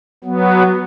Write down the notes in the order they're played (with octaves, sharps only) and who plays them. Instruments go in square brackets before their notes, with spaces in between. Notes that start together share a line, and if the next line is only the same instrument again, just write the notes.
[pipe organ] F#3 B3